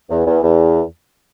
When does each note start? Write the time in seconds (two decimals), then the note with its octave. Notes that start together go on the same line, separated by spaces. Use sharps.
0.10 E2
0.25 E2
0.42 E2